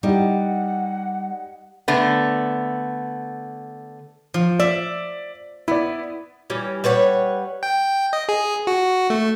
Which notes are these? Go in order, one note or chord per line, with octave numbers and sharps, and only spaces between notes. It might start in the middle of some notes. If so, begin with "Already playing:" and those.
G3 D#4 E4 G4 F#5
D3 A3 B3
F3
D5 E5
B3 E4 D5
E3 G3 C#4
G3 B4 C#5 F#5
G5
D#5
G#4
F#4
A3